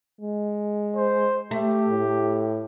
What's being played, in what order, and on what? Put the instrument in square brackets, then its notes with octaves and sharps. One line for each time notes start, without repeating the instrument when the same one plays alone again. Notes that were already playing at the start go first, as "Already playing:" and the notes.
[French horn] G#3
[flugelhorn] C5
[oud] A3 [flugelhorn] G4
[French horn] A2